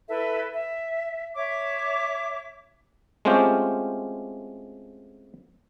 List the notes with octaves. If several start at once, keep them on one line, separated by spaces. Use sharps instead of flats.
E4 A4 B4 E5
E5
C#5 E5 D6
G#3 A3 C4 C#4 F4 G4